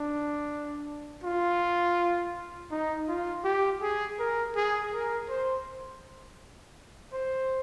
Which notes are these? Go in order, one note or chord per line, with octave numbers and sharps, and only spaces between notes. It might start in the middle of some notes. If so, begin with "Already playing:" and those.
Already playing: D4
F4
D#4
F4
G4
G#4
A#4
G#4
A#4
C5
C5